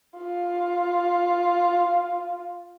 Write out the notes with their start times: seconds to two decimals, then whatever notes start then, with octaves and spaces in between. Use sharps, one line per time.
0.17 F4